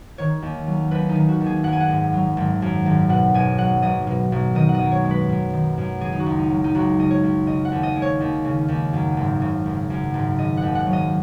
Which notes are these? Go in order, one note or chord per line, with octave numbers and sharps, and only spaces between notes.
D#3 C#5
D#2
F#3
D#2 B4
D#4
D#3
F#4
D#2
G#4
F#2 F#5
G#5
F#5
G#1
F#3
G#1
F#2
G#1
B2 F#5
B1 G#5
F#3 F#5
B1 D#5
B2
B1
D#3 D#5
F#5
D#5
F#2
C#5
G#3
B4
F#2
D#3
F#2
C#3 G#4
D#4
F#4
C#2
D#4
F#3
D#4
C#2 F#4
C#3 D#5
C#5
C#2
C#3 D#5
F#5
D#2
D#5
G#3
C#5
D#2
C#3
D#2
F#2
G#1
C#3
G#1
F#2
G#1
C#3 D#5
F#5
D#2
F#5
F#3
D#5